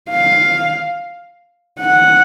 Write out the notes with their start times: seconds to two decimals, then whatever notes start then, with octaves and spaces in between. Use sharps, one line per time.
0.10 F5
1.80 F#5